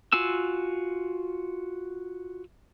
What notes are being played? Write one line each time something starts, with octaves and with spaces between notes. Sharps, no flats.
F4 F#4 G#5 E6